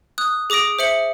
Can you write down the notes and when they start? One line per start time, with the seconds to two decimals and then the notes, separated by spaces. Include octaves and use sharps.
0.18 D#6 F#6
0.50 G#4 D6 D#6 A#6 D7
0.79 C5 E5 C#7 F#7